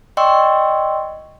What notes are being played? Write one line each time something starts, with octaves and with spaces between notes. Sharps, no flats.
D5 D#5 G5 C6 C#6 E6